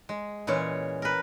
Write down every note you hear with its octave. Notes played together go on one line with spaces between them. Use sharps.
G#3
A#2 E3 G#3 C#4 C#5
A#4 B4